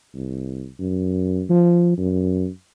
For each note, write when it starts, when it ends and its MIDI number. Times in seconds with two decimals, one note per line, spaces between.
0.15 0.66 36
0.79 1.43 42
1.49 1.96 53
1.98 2.47 42